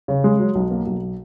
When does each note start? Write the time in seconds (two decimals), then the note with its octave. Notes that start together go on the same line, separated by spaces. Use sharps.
0.08 C#3
0.24 G#3
0.39 F#3
0.55 B1
0.71 A#3
0.87 B1